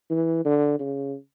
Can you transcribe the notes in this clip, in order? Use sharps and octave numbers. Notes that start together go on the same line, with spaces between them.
E3
D3
C#3